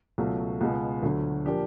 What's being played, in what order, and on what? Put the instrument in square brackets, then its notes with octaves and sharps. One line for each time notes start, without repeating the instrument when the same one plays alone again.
[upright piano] C#2 B2 F#3 A3
C#2 B2 G#3 B3
D2 D3 F#3
A#2 F3 A#3 D4 G4